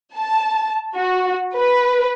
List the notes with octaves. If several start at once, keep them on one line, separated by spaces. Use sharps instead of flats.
A5
F#4
B4